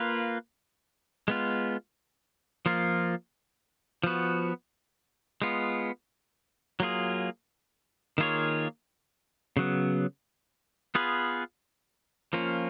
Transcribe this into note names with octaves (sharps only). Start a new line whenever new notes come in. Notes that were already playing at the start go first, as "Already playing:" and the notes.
Already playing: A#3 F4 B4
G#3 B3 F4
F3 A#3 F4
F3 B3 F#4
G#3 B3 F4
F#3 A#3 F4 G#4
D#3 A#3 F4 G#4 C#5
C#3 F#3 B3
B3 F4 G#4 B4
F3 A#3 C#4 F4